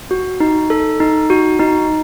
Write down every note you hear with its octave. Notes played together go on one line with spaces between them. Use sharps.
F#4
D#4
A4
D#4
F#4
D#4